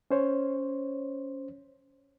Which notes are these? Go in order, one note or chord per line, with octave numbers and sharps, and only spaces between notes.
C#4 C5 C#5